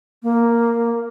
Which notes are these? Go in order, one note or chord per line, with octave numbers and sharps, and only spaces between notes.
A#3